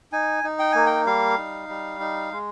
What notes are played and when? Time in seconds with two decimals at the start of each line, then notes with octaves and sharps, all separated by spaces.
0.12 D#4 G#5
0.44 D#4
0.59 G5
0.72 A#3 G#5
0.86 G5
1.06 G3 F5
1.38 D#4
1.69 G3
2.00 D#4
2.32 G#3